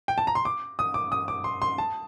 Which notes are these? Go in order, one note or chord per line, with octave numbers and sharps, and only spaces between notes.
G5
A5
A#5
C6
D6
D#6
D6
D#6
D6
C6
C6
A5